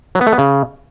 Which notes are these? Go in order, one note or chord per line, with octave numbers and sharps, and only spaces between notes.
F#3
B3
A3
B3
C#3